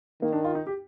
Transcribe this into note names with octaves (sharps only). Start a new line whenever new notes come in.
D#3 A#3
D4
F4
D#4
G4